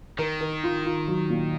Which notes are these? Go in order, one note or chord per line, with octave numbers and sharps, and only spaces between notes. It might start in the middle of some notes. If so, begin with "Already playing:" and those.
D#3 A#4
A#4
F4
F4
F#3
A#2